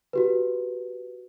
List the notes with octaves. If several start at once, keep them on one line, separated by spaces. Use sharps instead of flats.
F#4 G4 B4